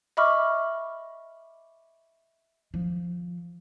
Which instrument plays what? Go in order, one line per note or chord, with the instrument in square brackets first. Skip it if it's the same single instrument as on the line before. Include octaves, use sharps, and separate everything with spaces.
[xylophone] D#5 E5 B5 C#6 D6 F6
[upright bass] F3